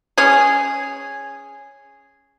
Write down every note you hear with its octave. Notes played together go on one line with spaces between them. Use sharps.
C#4 G#4